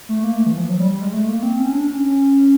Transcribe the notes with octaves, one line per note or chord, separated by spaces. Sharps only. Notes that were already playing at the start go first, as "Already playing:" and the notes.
A3
A#3
A3
E3
F3
F#3
G3
G3
G#3
A3
A#3
C4
C#4
D4
C#4